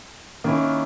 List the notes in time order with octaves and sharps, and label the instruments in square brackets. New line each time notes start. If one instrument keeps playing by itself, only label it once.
[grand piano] D#3 A#3 C#4 E4